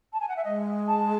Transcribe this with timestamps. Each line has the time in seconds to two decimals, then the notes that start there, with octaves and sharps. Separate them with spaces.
0.13 A5
0.20 G#5
0.29 F#5
0.36 E5
0.44 G#3 D#5
0.87 A5